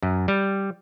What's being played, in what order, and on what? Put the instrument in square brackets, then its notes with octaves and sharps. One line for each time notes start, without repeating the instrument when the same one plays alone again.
[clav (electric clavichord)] F#2
G3